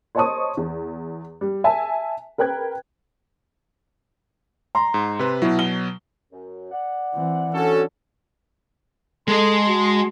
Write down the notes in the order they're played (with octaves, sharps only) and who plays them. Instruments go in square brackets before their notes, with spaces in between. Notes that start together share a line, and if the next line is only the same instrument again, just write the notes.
[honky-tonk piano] C5 C#5 D#5 A5 C#6 D#6
E2
G3
E5 G#5 A5
A#4 B4 G5 F#6 G#6
[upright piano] A#5 C6
[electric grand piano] G#2
C3 B4
[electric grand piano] B2 F#3 [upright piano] E4
[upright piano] G7
[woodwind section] F#2
D5 F#5
[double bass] E3 C4
[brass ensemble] C#4 F#4 A4 [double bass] D4
[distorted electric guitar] G#3 D#5 [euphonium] A4 [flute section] A5 C6
[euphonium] F#4